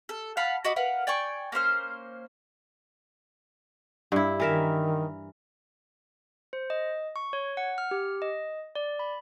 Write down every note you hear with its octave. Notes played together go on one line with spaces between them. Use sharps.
A4
F5 F#5 A5 B5
F#4 D#5 B5 D6
A#4 B4 F5 F#5
D5 G5 G#5 C#6
A#3 C#4 C5 F6
G2 E4
D#3 E3 A#4 E5
C5
D#5
C#6
C#5
F#5
F6
G4
D#5
D5
B5